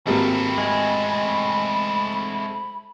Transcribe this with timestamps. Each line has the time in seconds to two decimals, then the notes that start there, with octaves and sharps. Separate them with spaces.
0.07 G#1 G3 A3 A#3 C4 B5
0.58 G#3